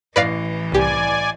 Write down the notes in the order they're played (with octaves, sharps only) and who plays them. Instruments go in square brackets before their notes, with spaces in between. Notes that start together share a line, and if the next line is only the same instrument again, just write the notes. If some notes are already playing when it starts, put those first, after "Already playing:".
[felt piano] A1 A#6 C7 [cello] E3 [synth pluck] B4 D5 F5
[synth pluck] C2 G4 [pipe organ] D5 G#5